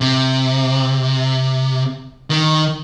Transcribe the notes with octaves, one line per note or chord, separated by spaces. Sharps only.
C3
D#3